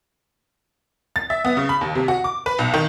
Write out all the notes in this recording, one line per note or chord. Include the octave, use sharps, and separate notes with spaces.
A6
E5
B3
C#3
B5
D#2
C3
F#4
D6
B4
B1
D#3